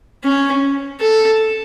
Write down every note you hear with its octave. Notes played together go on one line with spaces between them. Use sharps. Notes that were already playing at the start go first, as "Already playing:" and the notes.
C#4
A4